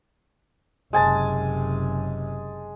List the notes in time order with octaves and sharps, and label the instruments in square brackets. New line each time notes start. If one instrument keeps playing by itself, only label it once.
[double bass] F#1 C3 [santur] G#3 G#5 A5